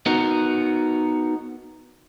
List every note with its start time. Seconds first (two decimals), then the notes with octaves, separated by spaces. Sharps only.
0.06 B3 D#4 F#4 A#4